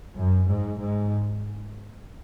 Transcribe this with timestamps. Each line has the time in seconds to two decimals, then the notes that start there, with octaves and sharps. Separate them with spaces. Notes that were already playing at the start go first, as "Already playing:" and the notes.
0.18 F#2
0.50 G#2
0.80 G#2